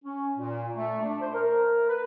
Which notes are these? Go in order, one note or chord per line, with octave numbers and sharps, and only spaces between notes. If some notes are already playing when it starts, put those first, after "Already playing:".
C#4
A#2
A3
D4
C5
A#4
B4